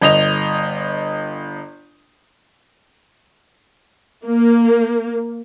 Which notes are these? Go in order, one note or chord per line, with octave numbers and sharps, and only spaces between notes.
G1 D#5 F7
A#3